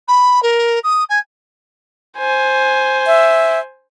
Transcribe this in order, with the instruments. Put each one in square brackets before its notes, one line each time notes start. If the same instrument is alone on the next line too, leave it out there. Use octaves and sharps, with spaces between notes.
[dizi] B5
A#4
D#6
G#5
[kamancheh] C5 G#5
[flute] E5